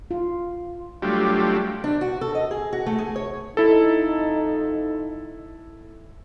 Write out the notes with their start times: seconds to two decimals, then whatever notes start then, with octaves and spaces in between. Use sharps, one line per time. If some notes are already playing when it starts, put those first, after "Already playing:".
0.11 F4
1.02 F#3 G3 A3 D4 F4 G4
1.84 D4
2.01 F#4
2.21 A4
2.35 D#5
2.51 G#4
2.73 F#4
2.86 A3
2.98 G#4
3.16 C#5
3.57 F2 D#4 E4 A4